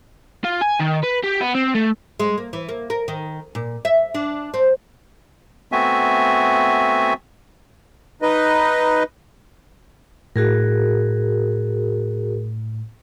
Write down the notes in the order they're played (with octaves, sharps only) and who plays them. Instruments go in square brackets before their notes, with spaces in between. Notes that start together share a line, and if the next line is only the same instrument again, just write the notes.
[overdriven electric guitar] F4
G#5
D#3
B4
G4
B3
C4
A3
[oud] G#3
A#3
E3
A#3
A#4
D#3
A#2
E5
D4
C4
[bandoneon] A3 B3 C4 F#4 E5 G#5
[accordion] D#4 B4 D#5
[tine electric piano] A2 [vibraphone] F#4 G#4 A#4